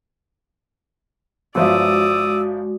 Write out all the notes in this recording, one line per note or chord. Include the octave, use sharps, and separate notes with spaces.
G1 F3 G#3 F#4 D5 E5 D#6 E6